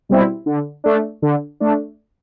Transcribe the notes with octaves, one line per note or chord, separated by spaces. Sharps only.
B2 G3 C4 E4
D3
A3 D4
D3
A3 D4